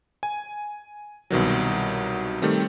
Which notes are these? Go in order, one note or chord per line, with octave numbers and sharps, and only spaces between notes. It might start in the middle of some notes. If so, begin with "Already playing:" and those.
G#5
C2 B2 D#3 F#3
D#3 G3 A3 C4